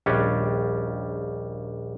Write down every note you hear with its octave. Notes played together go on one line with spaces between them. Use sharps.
A#1 D#2 G3 C#4 D4